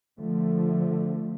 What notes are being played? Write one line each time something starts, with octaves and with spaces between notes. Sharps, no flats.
D3 F3 A3